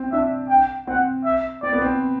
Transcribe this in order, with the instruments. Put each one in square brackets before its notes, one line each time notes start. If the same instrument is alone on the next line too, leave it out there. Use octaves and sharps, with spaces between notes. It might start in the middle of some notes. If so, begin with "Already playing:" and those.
Already playing: [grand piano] C4
[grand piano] D4 [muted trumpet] E5
[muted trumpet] G5
[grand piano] C4 [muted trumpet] F#5
[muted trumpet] E5
[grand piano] C4 [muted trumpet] D5
[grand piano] B3
C4